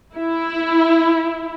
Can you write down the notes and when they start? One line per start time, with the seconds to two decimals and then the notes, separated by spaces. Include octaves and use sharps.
0.16 E4